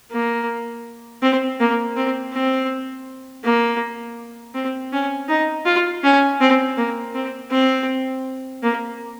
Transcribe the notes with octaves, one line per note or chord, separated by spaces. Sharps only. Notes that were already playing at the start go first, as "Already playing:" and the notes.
A#3
C4
A#3
C4
C4
A#3
C4
C#4
D#4
F4
C#4
C4
A#3
C4
C4
A#3